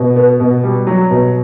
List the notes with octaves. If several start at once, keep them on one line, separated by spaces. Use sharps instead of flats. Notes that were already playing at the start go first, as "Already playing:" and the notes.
Already playing: B2
B3
B2
G3
F#3
B2